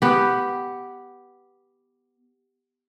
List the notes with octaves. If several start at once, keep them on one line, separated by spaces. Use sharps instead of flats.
B3 G4